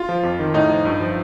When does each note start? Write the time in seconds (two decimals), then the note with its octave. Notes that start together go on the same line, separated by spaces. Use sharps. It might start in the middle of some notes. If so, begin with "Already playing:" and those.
Already playing: F4
0.09 F3
0.23 F2
0.39 D#3
0.54 A2 D#4
0.69 F3
0.85 G2
1.00 F3